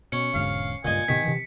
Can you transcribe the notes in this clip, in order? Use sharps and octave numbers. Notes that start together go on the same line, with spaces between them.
B2 C#4 C#7
E1 D2 G#2 F5
C#2 G2 A#2 D#5 G#5
A2 C3 D#3 B3 B6
C3 E3